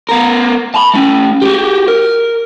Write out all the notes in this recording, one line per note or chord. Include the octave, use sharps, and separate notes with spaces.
B3 A#4
A5 B5
A3 C#4
F#4 G4
A#4